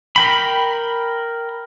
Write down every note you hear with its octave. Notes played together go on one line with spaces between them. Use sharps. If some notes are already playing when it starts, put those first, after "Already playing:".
A#4 G5 B5